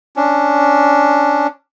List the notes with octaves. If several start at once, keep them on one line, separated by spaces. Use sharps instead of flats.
C#4 D4